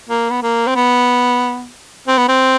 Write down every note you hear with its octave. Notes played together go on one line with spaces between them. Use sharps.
A#3
B3
A#3
C4
B3
C4
B3
C4